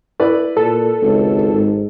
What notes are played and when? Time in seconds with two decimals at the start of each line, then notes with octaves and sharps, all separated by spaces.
0.20 E4 B4 D5
0.57 A#2 A4
1.01 G#1 C#2
1.54 G#2